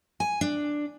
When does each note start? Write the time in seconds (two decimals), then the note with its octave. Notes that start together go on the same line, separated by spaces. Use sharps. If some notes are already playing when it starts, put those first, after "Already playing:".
0.20 G#5
0.41 D4